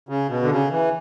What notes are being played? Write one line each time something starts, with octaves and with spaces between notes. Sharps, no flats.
C#3
B2
D3
C#3
E3